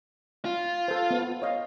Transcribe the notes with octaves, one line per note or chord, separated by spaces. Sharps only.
F4
A4 C5
B3
C#5 D#5 F5